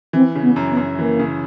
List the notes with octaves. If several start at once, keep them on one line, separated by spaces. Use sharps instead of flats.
E3 C4
C#3
B3
F#2
B3
F#2
E3 A#3
C#3